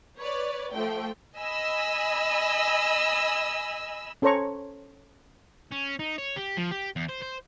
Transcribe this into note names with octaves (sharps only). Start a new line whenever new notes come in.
B4 C#5 D5
F3 A3 G5
D#5 G#5 B5 E6
C#4 A4 C5 C#5 A#5 C#6
C#4
D#4
C#5
G4
F3
G4
E2
C5
C5